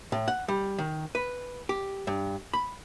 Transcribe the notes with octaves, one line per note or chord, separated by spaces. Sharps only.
A2
F#5
G3
D#3
B4
G4
G2
B5